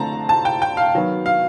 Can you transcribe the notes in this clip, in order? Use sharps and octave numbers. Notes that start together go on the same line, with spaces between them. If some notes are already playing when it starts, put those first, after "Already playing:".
Already playing: D3 F3 A3 C4 A5 A#5
A5
G5
G5
F5
D#3 F#3 B3
F5